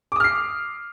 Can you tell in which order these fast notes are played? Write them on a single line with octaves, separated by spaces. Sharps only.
D6 D#6 F6 C7